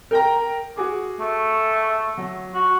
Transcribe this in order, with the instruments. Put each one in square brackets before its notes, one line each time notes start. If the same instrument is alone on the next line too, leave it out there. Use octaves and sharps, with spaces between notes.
[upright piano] A#4 G5 A#5
F#4 G#4 D6
[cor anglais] A3
[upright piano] F#3
[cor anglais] F#4